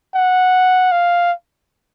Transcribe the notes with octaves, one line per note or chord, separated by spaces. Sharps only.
F#5
F5